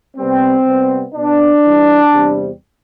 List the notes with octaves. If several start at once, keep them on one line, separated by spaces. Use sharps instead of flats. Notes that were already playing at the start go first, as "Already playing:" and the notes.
C3 G3 B3 C4
C3 G3 B3
B2 B3 D4
G2 E3 G3
E2 C3 G3 C4